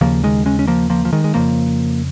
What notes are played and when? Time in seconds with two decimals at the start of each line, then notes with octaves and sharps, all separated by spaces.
0.01 D#2 C#3 F3 A#3
0.23 D#3 G#3
0.46 G#3 C#4
0.59 C#4
0.68 F3 A#3
0.90 F3 A#3
1.05 F3
1.13 D#3 G#3
1.24 G#3
1.34 F2 C#3 F3 A#3